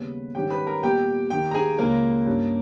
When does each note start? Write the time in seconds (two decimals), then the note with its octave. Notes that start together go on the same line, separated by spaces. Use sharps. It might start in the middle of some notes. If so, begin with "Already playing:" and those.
Already playing: D#2 C#3 G3 B3 B4
0.35 G#2 D#3 G3 C#4 G4 G5
0.50 B4 B5
0.66 A#4 A#5
0.82 A#2 G3 B3 G4 G5
1.30 D#2 D#3 A#3 G4 G5
1.51 A#5
1.54 G#4 G#5
1.78 C#2 C#3 G#3 A#3 A#4
2.26 G2 G3 C#4